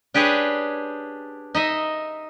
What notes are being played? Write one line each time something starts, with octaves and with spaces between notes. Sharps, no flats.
D4 G4 G#4 B4 C#5
D#4 D#5 E5